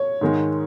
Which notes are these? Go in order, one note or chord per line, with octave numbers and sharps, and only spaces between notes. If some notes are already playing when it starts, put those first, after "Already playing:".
Already playing: C#5
G#2 D#3 G#3